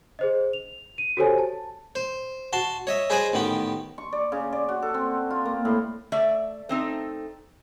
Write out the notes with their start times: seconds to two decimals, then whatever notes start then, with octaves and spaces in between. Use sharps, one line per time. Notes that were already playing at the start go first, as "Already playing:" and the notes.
0.19 G#4 C5 D#5
0.53 F7
0.98 D#7
1.17 F#4 G4 A4 C5 C#5 G#5
1.39 A5
1.95 C5
2.53 F#4 A5 C6
2.87 C#5 D#5 E5
3.10 G#4 B4 C5 D5 D#5 G#5
3.33 A1 D#3 B3 G4
3.98 C#6
4.13 D5
4.32 C#3
4.53 D5
4.69 F#4
4.82 A4
4.94 C4
5.30 F4
5.45 A#3
5.65 A2
6.12 A3 D5 E5
6.69 A3 C4 D#4